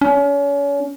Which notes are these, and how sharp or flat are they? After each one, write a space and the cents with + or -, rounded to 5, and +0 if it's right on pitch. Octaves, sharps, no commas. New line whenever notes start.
C#4 +35